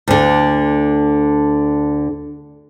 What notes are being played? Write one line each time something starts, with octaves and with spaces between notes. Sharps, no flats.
D2 D3